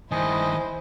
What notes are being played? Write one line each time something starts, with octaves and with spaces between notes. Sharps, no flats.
G2 D#3 E4 C5 D#5 G#5